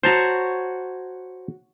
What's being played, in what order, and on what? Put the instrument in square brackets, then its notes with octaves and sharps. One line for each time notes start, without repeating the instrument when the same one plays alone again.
[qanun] F#4 C#5 [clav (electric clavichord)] C5 A5 A#5